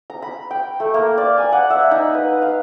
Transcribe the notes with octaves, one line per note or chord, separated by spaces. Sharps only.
A#5
B5
G5
A3
A#3
D5
G#5
F#5
E5
D#4
B4
F5